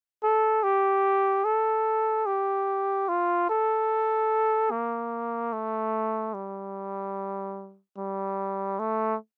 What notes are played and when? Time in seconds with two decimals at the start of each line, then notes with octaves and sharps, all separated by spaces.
0.23 A4
0.63 G4
1.44 A4
2.26 G4
3.08 F4
3.49 A4
4.71 A#3
5.53 A3
6.34 G3
7.97 G3
8.79 A3